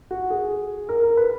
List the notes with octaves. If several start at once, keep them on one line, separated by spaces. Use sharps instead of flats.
F#4
G#4
A#4
A#4
B4